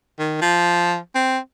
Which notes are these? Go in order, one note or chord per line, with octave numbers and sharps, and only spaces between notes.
D#3
F3
C4